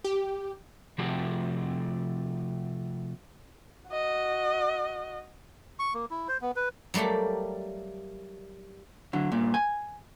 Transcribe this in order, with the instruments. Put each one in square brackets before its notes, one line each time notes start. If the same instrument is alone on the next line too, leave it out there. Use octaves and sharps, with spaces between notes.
[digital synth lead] G4
[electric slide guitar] C3 F3 A3 F#4 G4 A5
[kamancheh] F#4 D#5
[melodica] C#6
A#3
E4
C5
B3
B4
[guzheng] F#3 G3 A3 A#3 G4
[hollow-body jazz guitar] D3 F#3
G2 A#2
G#5